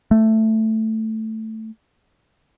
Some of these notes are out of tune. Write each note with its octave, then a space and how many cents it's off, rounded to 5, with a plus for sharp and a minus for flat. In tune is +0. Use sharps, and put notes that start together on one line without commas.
A3 +5